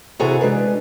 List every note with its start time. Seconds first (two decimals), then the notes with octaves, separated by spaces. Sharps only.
0.20 C3 E3 F#4 G#4 A4 A#5
0.41 G#3 D4 B4